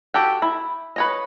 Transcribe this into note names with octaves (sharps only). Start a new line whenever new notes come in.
F#4 G4 A4 G5
E4
B4 C#5 D#5